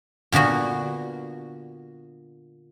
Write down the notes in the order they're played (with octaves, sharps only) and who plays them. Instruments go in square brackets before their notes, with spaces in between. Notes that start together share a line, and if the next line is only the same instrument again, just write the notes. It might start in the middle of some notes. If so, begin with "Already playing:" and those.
[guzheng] A#2 D3 B3 F#4